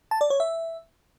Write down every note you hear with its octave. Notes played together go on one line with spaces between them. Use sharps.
A5
D5
C#5
E5